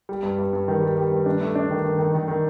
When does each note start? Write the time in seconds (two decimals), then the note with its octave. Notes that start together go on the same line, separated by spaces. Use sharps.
0.09 G3
0.23 G2
0.38 G2
0.53 G2
0.68 D#3
0.81 G3
0.97 G3
1.11 G2
1.26 D4
1.41 A3
1.56 D4
1.70 D#3
1.85 D#3
1.99 D#3
2.14 D#3
2.28 D#3